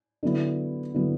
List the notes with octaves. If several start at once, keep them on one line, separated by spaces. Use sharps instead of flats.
D3 F#3 B3 E4
D3 F#3 B3 E4